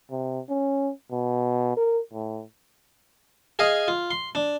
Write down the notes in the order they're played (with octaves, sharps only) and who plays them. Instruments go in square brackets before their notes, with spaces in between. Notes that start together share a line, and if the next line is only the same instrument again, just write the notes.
[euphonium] C3
C#4
B2
A#4
A2
[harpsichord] G#4 D#5 F5 G#5
F4
C6
D4